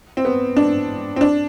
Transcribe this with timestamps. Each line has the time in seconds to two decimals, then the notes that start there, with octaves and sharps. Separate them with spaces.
0.17 C4
0.25 B3
0.57 D4
1.16 C4
1.21 D4